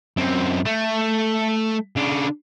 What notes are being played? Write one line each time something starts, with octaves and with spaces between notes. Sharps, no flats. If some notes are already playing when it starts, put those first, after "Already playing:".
F#2 C4
A3
C#3 D4